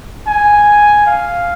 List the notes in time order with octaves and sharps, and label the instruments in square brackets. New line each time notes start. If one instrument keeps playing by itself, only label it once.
[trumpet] G#5
F5